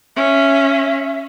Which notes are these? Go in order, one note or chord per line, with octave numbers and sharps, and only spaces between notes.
C#4 E5